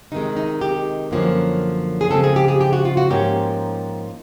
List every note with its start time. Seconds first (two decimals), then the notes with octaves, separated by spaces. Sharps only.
0.12 C3 D#3 G#3 D#4
0.37 D#4
0.61 G4
1.11 F#2 D3 F3 A#3 C#4
2.01 G#4
2.10 C#3 F3 G#3 C4 A4
2.24 G#4
2.36 G4
2.48 G#4
2.61 G4
2.73 F#4
2.85 F4
2.97 F#4
3.10 G#2 F3 A#3 C#4 G4